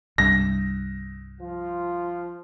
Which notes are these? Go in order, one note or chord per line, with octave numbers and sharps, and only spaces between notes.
C2 G2 A#6
F3 F4